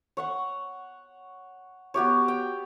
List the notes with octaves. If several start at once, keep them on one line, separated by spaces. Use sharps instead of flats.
C#5 F#5 C#6
B3 F#4 G4 C#5
G5